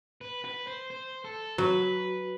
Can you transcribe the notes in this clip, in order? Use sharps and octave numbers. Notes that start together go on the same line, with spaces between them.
B4
B4
C5
C5
A4
F#3 B4